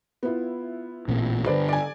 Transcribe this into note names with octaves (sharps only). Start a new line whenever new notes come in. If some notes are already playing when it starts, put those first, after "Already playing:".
B3 E4 F4
A1 A#2 C4
G2 D3 B4 C5 D5
D5 G#5